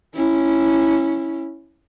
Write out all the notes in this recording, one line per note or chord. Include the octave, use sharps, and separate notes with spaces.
C#4 E4